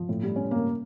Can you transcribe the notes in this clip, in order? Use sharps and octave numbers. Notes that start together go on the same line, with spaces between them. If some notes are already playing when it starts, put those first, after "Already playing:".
Already playing: F3
A2
G3
C#4
A#3